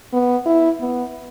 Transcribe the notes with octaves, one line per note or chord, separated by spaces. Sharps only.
B3
E4
B3